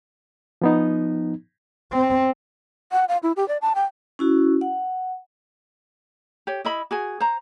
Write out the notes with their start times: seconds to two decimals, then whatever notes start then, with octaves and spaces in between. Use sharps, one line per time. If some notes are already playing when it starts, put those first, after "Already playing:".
0.62 F3 B3 D#4
1.92 C4
2.92 F#5
3.08 F5
3.23 E4
3.36 G4
3.48 D5
3.62 A5
3.75 G5
4.19 C#4 E4 F#4
4.61 F#5
6.47 G4 C#5
6.65 E4 D#5 B5
6.91 F#4 G#4 G#5
7.20 C5 A#5